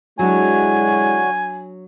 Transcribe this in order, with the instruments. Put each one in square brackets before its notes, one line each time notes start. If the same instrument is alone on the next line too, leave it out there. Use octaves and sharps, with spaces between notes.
[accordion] D3 F#4 C#5 [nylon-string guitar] F#3 D4 [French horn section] G#3 E4 [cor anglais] G#5